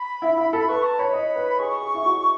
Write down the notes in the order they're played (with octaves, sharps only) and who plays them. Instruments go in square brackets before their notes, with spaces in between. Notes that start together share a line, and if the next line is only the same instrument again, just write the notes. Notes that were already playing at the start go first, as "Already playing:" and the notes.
Already playing: [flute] B5
[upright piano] E4
E4
A4
[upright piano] B4 [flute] C#6
[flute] A5
[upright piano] C#5 [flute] B5
[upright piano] D#5
B4
[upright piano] G#4 [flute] C#6
[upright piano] G#4
E4
F#4